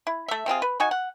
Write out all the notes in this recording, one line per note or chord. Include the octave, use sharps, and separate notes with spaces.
E4
A3 E5
C3 C4 F4 G#4
B4
D#4 F#4 G#5
F#5